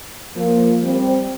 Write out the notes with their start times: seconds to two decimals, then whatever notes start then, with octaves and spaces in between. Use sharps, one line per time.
0.36 F3 A#3
0.83 G3 C4